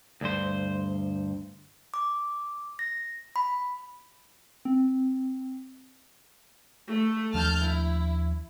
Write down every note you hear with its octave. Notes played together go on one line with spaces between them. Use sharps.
D2 G2 C5
D6
A#6
B5
C4
A3
D#2 F3 D4 A5 F6 G6
E4